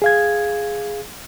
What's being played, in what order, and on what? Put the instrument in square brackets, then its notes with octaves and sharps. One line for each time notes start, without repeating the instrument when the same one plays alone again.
[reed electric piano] G#4 F5 G#6